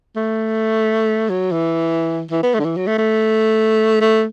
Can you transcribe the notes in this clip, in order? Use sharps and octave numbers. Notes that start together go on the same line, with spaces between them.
A3
F#3
E3
E3
B3
A3
D3
E3
F#3
A3
A3
A3